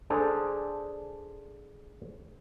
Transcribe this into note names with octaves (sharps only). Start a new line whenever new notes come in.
D4 G#4 A4 C5